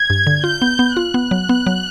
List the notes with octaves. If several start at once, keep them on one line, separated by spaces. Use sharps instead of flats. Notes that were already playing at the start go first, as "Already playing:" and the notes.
Already playing: G#6
G2
D3
F4 G6
B3
B3
F4 F#6
B3
F#3
B3
F#3